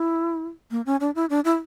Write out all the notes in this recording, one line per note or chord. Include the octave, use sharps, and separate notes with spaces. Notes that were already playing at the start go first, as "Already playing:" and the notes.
Already playing: E4
A#3
C#4
D4
E4
D4
E4